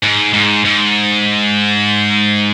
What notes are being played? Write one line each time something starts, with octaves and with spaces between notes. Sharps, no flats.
G#2
G#2
G#2